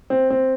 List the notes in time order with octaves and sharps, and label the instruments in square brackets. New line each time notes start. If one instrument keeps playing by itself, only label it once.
[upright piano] C4
C4